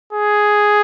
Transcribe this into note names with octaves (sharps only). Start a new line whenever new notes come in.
G#4